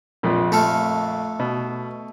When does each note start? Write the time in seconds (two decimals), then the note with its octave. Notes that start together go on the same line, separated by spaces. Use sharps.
0.23 A#1 F2 A#2
0.52 A3 A4 F5
1.40 B2